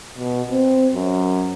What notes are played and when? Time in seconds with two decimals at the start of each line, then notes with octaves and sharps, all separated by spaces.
0.18 B2
0.51 C4
0.95 F#2